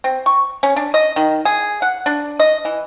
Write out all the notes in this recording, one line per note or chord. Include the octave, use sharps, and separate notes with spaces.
C4
C#6
C#4
D4
D#5
D#3
G#4
F#5
D4
D#5
E3